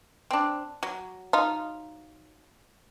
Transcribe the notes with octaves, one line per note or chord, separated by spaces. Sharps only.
C4 D4
F#3
D#4 F4